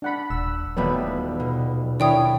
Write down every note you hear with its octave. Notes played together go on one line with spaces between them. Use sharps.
D4 F#5 B5
D#1 E6
D#1 F#3 G3 A3 B3 B4
B2
D#3 D4 E4 C#5 D5 G5 D#6